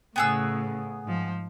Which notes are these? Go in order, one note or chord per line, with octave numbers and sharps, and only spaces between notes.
A2 C#3 B3 G#4 E6
G#2 F3